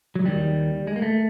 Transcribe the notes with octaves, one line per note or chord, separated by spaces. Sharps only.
F#3
D#2 D#3 G3
G#3
A#3
A3